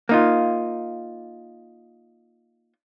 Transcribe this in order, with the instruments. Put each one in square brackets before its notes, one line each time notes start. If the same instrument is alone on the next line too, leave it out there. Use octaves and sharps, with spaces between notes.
[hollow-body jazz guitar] A#3 D#4 F4